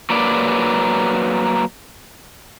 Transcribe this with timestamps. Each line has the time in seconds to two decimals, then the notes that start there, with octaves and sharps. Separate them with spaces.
0.10 F#3 A#3 B4 D5